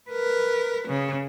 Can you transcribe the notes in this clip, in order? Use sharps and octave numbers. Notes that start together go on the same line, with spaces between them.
A#4 B4
C#3